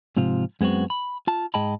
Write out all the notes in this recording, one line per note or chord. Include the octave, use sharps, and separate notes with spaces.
G#2 C3 F3 F4
F#2 G#3 B3 C4 F#4
B5
F4 A5
G#2 G#4 D#5 G5 A5 B5